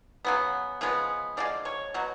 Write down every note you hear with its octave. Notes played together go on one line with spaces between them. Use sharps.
C#3 F#3 B3
C#3 F3 G#3 B3
D3 F3 G#3 D5
C#5
B2 F#3